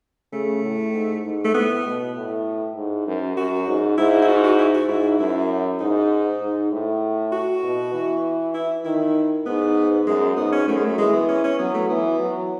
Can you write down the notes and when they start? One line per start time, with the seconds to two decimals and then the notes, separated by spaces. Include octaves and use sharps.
0.33 C#3 A3
0.63 A2
0.93 G#2
1.25 G#2
1.45 A3
1.54 A2 B3
1.85 B2
2.16 A2
2.76 G#2
3.07 F#2
3.37 F#2 F#4
3.67 G#2
3.98 G#2 E4
4.22 E4
4.28 F#4
4.44 F#4
4.58 E4
4.74 F#4
4.89 G#2 E4
5.19 F#2 E4
5.80 G#2 D#4
6.41 G#2
6.72 A2
7.32 F#4
7.64 B2
7.94 E3
8.54 E4
8.85 D#3 E4
9.45 G#2 B3
10.07 F#2 G#3
10.37 G#2 B3
10.52 C#4
10.67 F#2 A3
10.76 G#3
10.85 A3
10.98 E3 G#3
11.13 B3
11.29 C#4
11.44 C#4
11.59 F#3 B3
11.74 A3
11.89 E3 B3
12.19 F#3